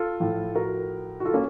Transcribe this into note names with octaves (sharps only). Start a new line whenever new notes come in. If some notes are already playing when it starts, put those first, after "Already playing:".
Already playing: F4 A4
A2 F3
F#4 A#4
F#4
F4 A4
A#3 C#4